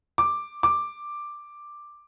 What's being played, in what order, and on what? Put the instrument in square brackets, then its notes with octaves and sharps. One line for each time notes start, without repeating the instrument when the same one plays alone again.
[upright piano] D6
D6